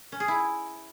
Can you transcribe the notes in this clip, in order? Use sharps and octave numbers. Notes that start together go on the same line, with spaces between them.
C#4
G#4
E4